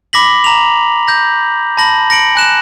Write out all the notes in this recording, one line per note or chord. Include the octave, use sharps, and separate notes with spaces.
B5 D6 A#6 B6 F#7
A#5 F7
G6 A#6
A5 B5 A#6 F#7
A#6 C#7 D7 F#7
G#5 F#6 E7